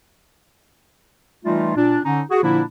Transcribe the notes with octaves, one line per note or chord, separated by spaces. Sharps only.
E3 G3 A3 D#4 F4
A#2 D4
D3 C#4 D#4
F#4 G#4
A#2 D3 F3 A#3 D4 E4